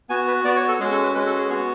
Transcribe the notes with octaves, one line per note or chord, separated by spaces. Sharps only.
B3 F#4 G#5
B4
B3 F#4 D5
C#5
A4
G#3 C#4 F#4 G#4
A4
B4
G#3 C#4 F#4 B4
A4
G#4
B3 F#4 G#4